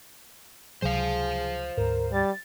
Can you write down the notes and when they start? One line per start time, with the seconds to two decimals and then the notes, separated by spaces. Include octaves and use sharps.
0.82 C#2 C3 F#3 G#4 C5 F5
1.77 D2 G#2 A#4
2.13 G3 A6